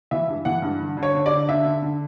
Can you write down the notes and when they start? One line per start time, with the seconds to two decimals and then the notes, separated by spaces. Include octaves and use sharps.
0.11 E3 E5
0.28 G2
0.45 E3 F#5
0.62 G2
0.79 D3
0.97 D3
1.03 C#5
1.15 D3
1.26 D5
1.32 D3
1.49 D3 E5
1.66 D3
1.83 D3